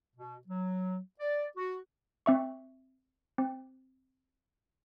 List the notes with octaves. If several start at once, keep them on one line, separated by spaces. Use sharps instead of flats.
B2
F#3
D5
F#4
C4 E5 C#6
C4